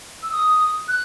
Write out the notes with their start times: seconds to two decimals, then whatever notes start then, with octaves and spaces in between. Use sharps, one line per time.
0.23 E6
0.32 D#6
0.88 F#6